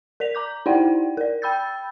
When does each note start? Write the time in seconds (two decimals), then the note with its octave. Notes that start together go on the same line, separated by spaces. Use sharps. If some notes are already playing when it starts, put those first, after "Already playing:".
0.20 A#4 D5 B6 F7
0.35 A#5 D6 G6
0.66 D#4 E4 C5 D5 F#5 G5
1.17 A#4 D5
1.42 G5 B5 E6 G6 A6